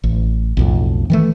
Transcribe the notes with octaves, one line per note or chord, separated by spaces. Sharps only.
A1
B1 F2 A2
D#3 E3 A3